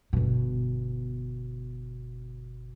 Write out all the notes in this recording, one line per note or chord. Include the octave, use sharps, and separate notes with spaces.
G1 B2